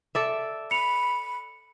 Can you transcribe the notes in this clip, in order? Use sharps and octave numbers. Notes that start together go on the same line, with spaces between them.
A4 D5 E5
B5 C#7 F7